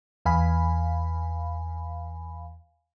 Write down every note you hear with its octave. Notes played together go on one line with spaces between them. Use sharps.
E2 F5 G#5 B5